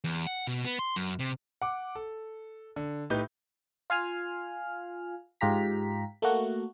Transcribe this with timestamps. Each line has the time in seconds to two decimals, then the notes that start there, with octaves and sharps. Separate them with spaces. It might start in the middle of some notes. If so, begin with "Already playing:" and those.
0.04 E2
0.26 F#5
0.47 B2
0.65 B3
0.79 C6
0.96 F#2
1.19 C3
1.62 F#5 D6
1.95 A4
2.76 D3
3.10 A2 D#4 G4 B4 G6
3.90 F4 F5 G#5 F6
5.41 G#2 F4 G4 A#5 B6
6.22 A3 A#3 F#4